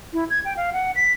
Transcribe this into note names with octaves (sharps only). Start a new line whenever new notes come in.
E4
G#6
G5
F5
F#5
B6